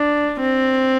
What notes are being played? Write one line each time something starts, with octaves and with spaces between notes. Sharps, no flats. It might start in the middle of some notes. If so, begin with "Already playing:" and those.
Already playing: D4
C4